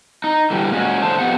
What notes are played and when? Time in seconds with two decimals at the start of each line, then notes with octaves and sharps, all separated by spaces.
0.24 D#4
0.51 D3 E3 G3
0.72 A#2 G#3 C#4 F#4
1.02 A#2 D3 C5 A5
1.19 F2 B2 B3 G4 F#5